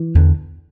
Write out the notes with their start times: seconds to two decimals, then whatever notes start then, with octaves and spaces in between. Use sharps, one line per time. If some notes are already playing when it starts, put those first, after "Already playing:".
Already playing: E3
0.15 E2 D3